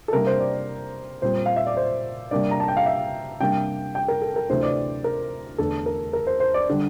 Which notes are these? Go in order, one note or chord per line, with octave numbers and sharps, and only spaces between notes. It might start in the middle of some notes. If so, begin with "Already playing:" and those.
A4
C3 G3 A#3 D4 A#4
C5
D5
A#2 G3 C4 C5
F5
E5
D5
C5
C3 G3 A#3 D4 D5
A#5
A5
G5
F5
E5
C3 G3 A#3 D4 G5
G5
A#4
A4
A#4
D2 C3 E3 A3 C4 C5
D5
A#4
E2 D3 A3 D4 A4
A#4
A#4
C5
C5
D5
D3 G3